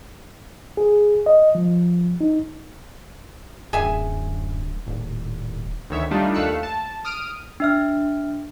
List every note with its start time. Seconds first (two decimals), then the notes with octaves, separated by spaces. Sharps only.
0.77 G#4
1.26 D#5
1.55 F3
2.21 D#4
3.73 D1 F#2 G#4 E5 G#5
4.87 D#1 A2
5.90 D2 D#3 C#5 E5
6.11 G3 A3 D4 D#4 F4
6.35 D#2 A3 F5 E6 F#6 C#7
6.63 A5
7.05 D#6 F6 D7 D#7
7.60 D4 E5 F6